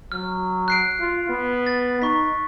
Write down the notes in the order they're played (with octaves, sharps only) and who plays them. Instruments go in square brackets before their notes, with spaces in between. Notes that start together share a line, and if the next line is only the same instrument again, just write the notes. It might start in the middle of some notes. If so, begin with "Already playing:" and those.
[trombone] F#3 [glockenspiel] F6
[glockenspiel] F#6 C7 D7
[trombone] F4
B3
[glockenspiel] A6
[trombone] D#4 [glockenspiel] C#6 B6